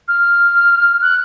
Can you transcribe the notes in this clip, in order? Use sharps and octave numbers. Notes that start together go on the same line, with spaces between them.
F6
F#6